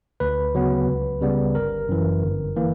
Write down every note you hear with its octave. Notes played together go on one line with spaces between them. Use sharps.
D2 B4
C#3 F#3 B3
C#2
C#3 G3 B3
G1 A#4
F#2 E3
G1
E3 A#3